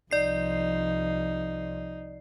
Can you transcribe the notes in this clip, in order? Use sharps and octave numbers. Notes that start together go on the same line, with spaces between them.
C2 F3 D#4 D5 C7